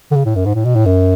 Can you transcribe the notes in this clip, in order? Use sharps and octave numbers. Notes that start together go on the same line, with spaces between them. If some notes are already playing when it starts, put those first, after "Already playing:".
D3
C#3
A2
F#2
G#2
A2
B2
A2
F#2